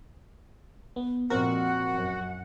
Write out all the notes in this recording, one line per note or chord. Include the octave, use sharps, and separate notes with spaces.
B3
F2 A#2 C4 F#4 A#4 F#5
F#2